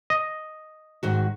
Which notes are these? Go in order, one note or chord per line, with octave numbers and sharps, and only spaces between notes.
D#5
G#2 D#3 F#4